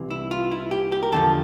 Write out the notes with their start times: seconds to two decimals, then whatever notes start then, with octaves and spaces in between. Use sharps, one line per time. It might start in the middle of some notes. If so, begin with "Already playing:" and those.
Already playing: C2 C3 E3
0.10 E4
0.31 F4
0.51 E4
0.71 G4
0.92 G4
1.03 A#4
1.12 E2 D3 F3 A4